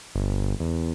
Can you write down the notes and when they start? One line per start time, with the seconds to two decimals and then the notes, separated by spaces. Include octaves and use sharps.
0.15 G1
0.60 E2